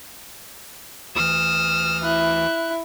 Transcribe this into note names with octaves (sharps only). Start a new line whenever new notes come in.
D2 E3 D#6 F6 E7
E4 F#6